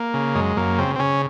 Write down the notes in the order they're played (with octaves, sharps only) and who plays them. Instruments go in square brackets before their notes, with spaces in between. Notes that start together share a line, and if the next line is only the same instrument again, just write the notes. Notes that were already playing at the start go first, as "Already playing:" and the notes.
Already playing: [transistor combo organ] A#3
C#3
F#2 G#3
F#2 A#3
C#3 C4
C4
C#3 C#4